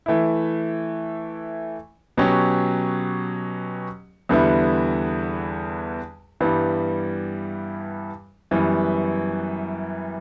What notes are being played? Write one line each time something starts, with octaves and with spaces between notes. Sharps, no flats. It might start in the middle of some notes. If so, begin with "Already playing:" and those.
E3 A3 E4
B2 F#3 C#4 G4
E2 D3 G3 B3 E4
G2 E3 G3 B3
F#2 E3 G3 B3